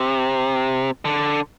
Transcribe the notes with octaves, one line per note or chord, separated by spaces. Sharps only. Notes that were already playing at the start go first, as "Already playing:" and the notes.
Already playing: C3
D3